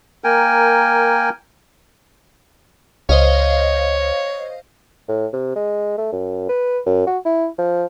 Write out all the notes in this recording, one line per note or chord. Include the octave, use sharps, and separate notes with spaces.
A#3 A#4 G5 G#5
C#2 C5 C#5 D#5 F5
A2
C3
G#3
A3
F#2
B4
F#2
F#4
E4
F3